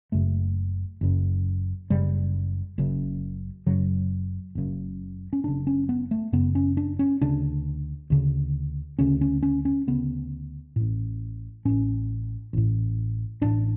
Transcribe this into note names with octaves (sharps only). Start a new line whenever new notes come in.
F#1 F#2 C#3 A3
F#1 F#2 C#3
F#1 F#2 C#3 G3
F#1 F#2 C#3
F#1 F#2 C#3 F#3
F#1 F#2 C#3
C#4
F#1 F#2 C#3 D4
C#4
B3
A3
F#1 F#2 C#3 B3
C#4
D4
C#4
D2 C#3 D4
D2 C#3
D2 C#3 C#4
C#4
C#4
C#4
D2 C#3 B3
A1 A2
A1 A2 C#4
A1 A2
A1 A2 D4